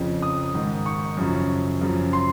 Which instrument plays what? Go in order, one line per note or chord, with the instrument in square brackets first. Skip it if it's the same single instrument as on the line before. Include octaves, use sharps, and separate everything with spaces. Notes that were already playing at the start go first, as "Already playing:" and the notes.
Already playing: [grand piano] F2 C#3 F3
D#6
G#2 D#3
C#6
F#2 C#3 F3
F#2 C#3 F3
C6